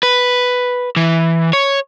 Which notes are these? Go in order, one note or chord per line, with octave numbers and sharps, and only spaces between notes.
B4
E3
C#5